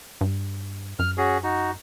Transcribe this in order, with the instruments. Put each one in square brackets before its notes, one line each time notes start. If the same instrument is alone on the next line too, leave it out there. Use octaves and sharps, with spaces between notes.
[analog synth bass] G2
[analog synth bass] F#2 [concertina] F6
[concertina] C#4 F#4 G#4
D#4 F#4